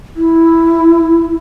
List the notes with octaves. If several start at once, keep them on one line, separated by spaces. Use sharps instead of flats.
E4